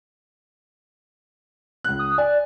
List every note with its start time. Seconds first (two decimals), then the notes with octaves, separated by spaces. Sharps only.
1.84 C#2 F#6
1.99 D#6
2.18 D5 G#5